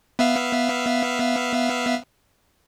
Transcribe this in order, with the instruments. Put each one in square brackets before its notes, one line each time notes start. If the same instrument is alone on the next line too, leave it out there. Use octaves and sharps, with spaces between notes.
[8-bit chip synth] B3 E5 F5